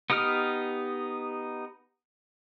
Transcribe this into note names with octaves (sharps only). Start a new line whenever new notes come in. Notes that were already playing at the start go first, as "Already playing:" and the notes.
B3 D#4 G4 D#6 F6